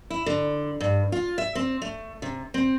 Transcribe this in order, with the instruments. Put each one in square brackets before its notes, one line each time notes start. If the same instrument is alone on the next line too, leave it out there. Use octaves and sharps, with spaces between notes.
[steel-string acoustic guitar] E4
D3
G2
F4
E5
C4
A3
C3
C4